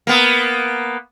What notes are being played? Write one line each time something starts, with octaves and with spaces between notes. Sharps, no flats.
A#3 B3